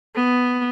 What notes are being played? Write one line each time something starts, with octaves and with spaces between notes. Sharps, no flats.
B3